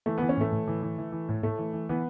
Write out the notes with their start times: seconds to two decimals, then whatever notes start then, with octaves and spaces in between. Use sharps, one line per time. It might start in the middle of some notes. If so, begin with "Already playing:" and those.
0.06 E3 A3
0.18 E3 B3
0.29 C#4
0.37 A2 A3
0.52 A2
0.67 E3
0.83 E3
0.98 E3
1.12 E3
1.29 A2
1.43 A2 A3
1.58 E3
1.73 E3
1.89 E3 B3